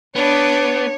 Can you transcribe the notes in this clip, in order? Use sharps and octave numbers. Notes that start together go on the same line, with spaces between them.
B3 D4 C#5 D5